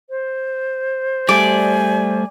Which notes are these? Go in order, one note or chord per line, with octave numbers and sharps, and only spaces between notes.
C5
G3 A3 D5 G#5